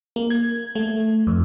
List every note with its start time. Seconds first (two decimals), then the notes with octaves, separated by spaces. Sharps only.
0.16 A#3
0.30 G#6
0.75 A3
1.27 F2